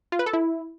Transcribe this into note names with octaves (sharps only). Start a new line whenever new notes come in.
F4
B4
A4
E4